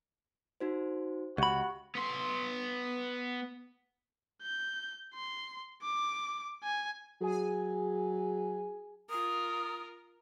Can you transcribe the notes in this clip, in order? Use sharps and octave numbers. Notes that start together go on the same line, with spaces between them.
D#4 F#4 C5
C#2 F#4 G4 B5
B3 C6
G6
C6
D6
G#5
F#3 G#4 G#5
F4 A#4 D#6